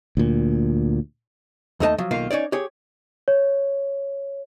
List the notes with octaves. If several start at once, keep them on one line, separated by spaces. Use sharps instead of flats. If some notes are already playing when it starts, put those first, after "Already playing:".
D2 A#2
D#2 A3 D#4 A#4 D#5 A5
F3 F#3
B1 D#3 A#3 F4 F5
C#4 D#4 C#5 D5
G4 G#4 C#5
C#5